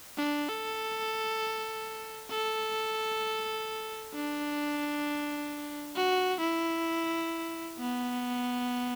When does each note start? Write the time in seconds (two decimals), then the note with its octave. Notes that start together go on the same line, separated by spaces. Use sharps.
0.18 D4
0.49 A4
2.30 A4
4.14 D4
5.95 F#4
6.41 E4
7.79 B3